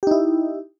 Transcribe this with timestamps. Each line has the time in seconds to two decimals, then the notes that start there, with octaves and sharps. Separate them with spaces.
0.03 G4
0.07 D#4
0.11 E4